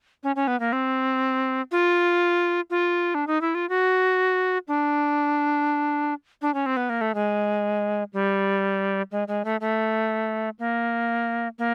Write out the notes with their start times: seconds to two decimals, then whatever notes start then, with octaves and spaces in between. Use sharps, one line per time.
0.23 C#4
0.36 C#4
0.47 B3
0.60 A#3
0.73 C4
1.72 F4
2.70 F4
3.15 D4
3.27 D#4
3.41 E4
3.55 F4
3.69 F#4
4.68 D4
6.42 D4
6.54 C#4
6.66 C4
6.77 B3
6.90 A#3
7.01 A3
7.15 G#3
8.13 G3
9.11 G#3
9.28 G#3
9.45 A3
9.61 A3
10.59 A#3
11.59 A#3